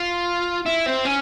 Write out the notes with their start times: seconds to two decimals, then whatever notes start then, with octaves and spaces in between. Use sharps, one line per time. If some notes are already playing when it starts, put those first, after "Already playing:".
Already playing: F4
0.66 E4
0.86 C4
1.05 C#4